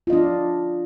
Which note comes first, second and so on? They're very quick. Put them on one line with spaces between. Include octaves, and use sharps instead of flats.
F4 D#5 D4